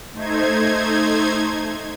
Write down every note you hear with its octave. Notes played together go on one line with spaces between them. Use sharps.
A3 D#4 C5 G#6